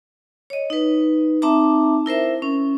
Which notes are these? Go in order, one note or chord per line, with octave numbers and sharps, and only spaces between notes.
C#5 D#5
D#4 B4
C4 D#4 E5 A5 A#5 D6
E4 A#4 C5 E5
C#4